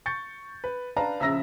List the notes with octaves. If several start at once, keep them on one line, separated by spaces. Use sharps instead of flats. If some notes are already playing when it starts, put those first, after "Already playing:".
C#6 G6 A6 C#7
B4
D4 B4 F5 A5 A#5
A#1 C#3 E5 A#5 E6 A#6